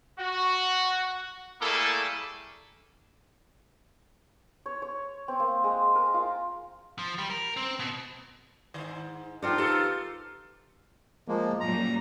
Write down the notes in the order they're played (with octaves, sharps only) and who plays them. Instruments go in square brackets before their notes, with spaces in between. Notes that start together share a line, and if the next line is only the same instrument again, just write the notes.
[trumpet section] F#4
G3 A3 A#3 E4 G#4 A4
[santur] C#5
C#5
C4
A#3
G#3
A#4
F4
[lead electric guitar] F3
G3
A#4
C4
B2
[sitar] G#2 D#3
[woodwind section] F3 D#4 F4 [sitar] D4 [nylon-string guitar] A4 F#5 G5
[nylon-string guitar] G4 B4 [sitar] A4
[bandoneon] F3 G#3 A#3
[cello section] F#2 A#2 G3 [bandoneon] A#5